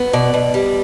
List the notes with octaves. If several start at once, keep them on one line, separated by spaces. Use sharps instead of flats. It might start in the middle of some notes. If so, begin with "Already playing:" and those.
Already playing: B3
B2 D5
B2
G3